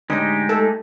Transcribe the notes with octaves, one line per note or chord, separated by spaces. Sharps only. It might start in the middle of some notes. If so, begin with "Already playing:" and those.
A2 D3 G#3 D#4 G4
A3 A4